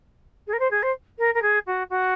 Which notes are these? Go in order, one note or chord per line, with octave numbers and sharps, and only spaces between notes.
G#4
A#4
C5
G#4
C5
A#4
A#4
G#4
F#4
F#4